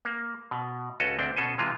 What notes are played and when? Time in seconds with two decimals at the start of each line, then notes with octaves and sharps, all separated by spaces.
0.05 A#3
0.51 B2
1.00 C#2 C#4 F#4 A4 D#5
1.19 D2 C4 D4 G5
1.36 B2 C#4 A4 C5 G#5
1.58 C3 E3 G#3 F4